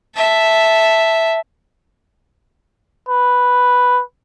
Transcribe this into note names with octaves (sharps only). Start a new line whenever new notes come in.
E5 A5
B4